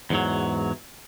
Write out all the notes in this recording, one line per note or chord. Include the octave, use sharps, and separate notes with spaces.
E2 G#2 F#3